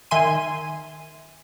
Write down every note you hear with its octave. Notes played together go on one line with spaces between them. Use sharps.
D#3 E5 G#5 C6 D#7